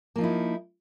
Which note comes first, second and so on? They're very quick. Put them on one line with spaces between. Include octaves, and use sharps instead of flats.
A#3 F3 D#4 E4